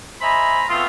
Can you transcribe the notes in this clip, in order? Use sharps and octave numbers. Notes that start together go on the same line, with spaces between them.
C5 D#5 E5 G#5 A#5 B5
G#3 A3 B3 C4 F4